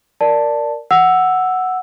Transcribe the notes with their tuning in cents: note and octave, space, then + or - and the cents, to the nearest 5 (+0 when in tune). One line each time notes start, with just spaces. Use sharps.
A#4 -5 D5 +0 A5 +5
F#5 +0 E6 +0